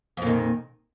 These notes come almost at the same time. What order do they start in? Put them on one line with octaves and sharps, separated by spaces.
F2 A#2 D#3